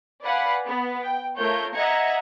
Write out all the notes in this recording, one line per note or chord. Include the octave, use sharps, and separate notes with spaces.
B4 D5 F5 F#5 G#5 B5
B3
G5
A3 F4 A#4 C#5 G6
D#5 E5 F#5 A#5 G#6 C#7